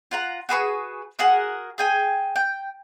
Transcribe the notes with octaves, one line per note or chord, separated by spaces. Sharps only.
F4 F#5 A#5
F#4 G#4 B4 C#6
F#4 G#4 A#4 F#5
G#4 G5 G#5
G5